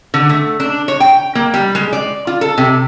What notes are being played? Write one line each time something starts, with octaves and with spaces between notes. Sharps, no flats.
D3
A3
D4
C#5
G5
A#3
G3
G#3
D5
F4
A4
C3